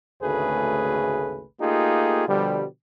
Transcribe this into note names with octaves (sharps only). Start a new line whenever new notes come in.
G#1 D2 C#3 A3 G#4 B4
A3 A#3 D#4 F4 G4 G#4
B2 D3 F3 G3